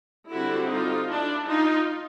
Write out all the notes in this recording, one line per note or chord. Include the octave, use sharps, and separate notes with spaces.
D3 G3 C4 E4 F#4
D#4 F4
D4 E4
D#4 F4